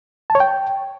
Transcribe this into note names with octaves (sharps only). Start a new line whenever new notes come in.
A5
C#5
G5